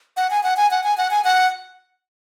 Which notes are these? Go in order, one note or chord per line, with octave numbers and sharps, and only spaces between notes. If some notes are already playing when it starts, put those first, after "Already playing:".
F#5
G#5
F#5
G#5
F#5
G#5
F#5
G#5
F#5